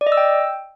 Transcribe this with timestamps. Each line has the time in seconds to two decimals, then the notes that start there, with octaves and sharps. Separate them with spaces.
0.01 D5
0.07 D#5
0.12 E6
0.17 G5